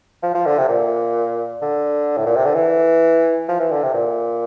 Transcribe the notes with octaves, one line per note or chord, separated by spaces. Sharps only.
F3
F3
D3
C3
A#2
D3
A2
A#2
C3
D3
E3
F3
E3
D3
C3
A#2